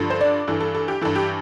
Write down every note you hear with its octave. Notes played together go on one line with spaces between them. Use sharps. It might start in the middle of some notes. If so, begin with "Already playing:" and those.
Already playing: G2 D3 F3
C5
D4 D5
G2 E3 A4
A4
A4
G4
G2 E3 A4
G4